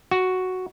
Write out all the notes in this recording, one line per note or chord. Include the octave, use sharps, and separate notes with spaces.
F#4